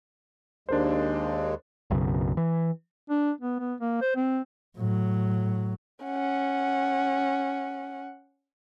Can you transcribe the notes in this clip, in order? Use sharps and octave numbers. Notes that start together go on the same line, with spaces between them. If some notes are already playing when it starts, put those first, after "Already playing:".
D#2 G#3 D4 A#4 C5
B1 F#2 C#3
E3
D4
B3
B3
A#3
C5
C4
A2 F#3
C#4 F#5